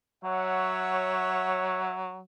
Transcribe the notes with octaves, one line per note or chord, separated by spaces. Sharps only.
F#3 C#5 E5 F#5